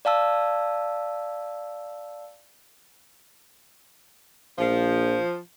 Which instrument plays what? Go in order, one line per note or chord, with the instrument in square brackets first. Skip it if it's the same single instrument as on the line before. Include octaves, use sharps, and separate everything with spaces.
[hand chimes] D5 F5 A5 E6
[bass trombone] A#1 [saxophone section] F3